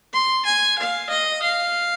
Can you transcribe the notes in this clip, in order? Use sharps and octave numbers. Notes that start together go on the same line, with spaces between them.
C6
G#5
F5
D#5
F5